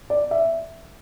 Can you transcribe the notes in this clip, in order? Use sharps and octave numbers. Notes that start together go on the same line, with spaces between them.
D5
E5